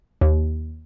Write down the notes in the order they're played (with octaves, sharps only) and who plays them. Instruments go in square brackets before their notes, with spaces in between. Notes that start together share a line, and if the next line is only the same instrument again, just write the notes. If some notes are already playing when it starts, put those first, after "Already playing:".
[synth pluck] D#2